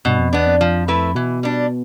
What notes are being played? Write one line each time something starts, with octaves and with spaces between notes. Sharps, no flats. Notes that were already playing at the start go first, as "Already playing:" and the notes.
G2 B2
F2
E2 B3 D4
F2
F3
A3 E4 B4
B2 E3
G3 D4